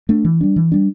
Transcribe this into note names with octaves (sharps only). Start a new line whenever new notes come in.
A3 D4
E3
G3 D4
E3
G3 D4